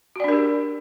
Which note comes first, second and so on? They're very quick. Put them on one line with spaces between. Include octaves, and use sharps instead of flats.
F#4 D5 D4 A#4 G4